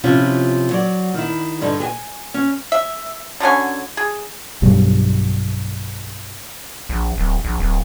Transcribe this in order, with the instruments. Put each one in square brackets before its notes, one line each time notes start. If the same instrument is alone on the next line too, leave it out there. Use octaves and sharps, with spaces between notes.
[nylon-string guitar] C3 F3 C#4 E4 F4
F#3 D5
D#3 E4
G2 D3 D#4
G#4 G#5
C#4
[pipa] E5
D3 F#3 C#4 G#5
G#4
[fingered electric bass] B1 G2 B2 G3
[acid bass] A#1
D1
A#1
D1